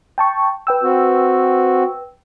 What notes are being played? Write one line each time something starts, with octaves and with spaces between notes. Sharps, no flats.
G5 A5 C#6
B4 G5 E6
C4 F#4